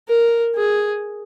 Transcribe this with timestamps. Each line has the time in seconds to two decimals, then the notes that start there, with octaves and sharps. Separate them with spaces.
0.08 A#4
0.56 G#4